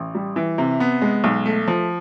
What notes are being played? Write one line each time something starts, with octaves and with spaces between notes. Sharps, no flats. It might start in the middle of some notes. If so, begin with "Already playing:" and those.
Already playing: A1
G3
E3
C3
B3
G#3
B1
A3
F3